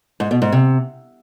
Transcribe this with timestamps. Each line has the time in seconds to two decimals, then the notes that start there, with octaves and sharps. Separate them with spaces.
0.20 G#2
0.31 B2
0.42 G#2
0.52 C3